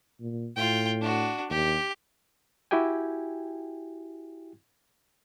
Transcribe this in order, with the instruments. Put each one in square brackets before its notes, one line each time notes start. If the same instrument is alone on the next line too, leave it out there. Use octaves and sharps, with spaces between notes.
[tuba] A#2
[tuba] A2 [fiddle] F4 G5
[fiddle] D4 F#4
[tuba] D#2 [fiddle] G4
[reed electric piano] E4 F#4 G4 G5 G#5